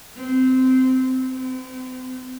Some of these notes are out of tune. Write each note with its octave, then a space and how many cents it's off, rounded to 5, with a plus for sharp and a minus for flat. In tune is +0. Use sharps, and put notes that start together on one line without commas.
C4 -15
C4 -40